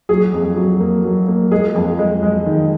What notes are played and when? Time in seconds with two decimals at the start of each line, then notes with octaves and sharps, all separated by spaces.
0.09 F#3 G#4
0.33 F2
0.56 F#3
0.80 A#3
1.04 F#3
1.28 A#3
1.51 G#3 G#4
1.75 F2
1.99 G#3
2.23 G#3
2.46 D#3